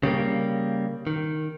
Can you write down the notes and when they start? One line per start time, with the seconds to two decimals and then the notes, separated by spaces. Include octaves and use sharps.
0.03 C#3 G3 A#3
1.07 D#3